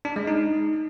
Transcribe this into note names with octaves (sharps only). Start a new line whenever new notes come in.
D4
G#3
D#4